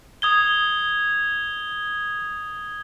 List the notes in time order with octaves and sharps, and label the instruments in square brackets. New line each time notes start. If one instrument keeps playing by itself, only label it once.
[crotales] D#6 G#6 G7